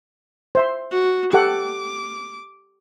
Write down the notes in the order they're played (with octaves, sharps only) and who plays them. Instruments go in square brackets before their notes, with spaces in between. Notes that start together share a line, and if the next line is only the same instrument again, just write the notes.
[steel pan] C5 E5 C6
[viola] F#4
[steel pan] G4 A4 F#5 [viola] D6